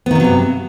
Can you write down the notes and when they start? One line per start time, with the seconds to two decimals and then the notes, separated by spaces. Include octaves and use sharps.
0.06 B3
0.11 D#3
0.15 C3
0.20 F#3
0.24 G2